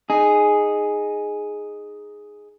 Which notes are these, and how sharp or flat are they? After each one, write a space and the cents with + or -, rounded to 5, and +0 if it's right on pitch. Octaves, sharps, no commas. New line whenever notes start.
D#4 -10 G#4 +0